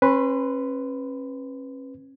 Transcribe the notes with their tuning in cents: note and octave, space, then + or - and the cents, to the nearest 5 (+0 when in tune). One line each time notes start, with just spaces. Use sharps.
C#4 -40 B4 +0 C6 -25